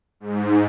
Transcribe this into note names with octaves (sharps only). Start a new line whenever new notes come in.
G#2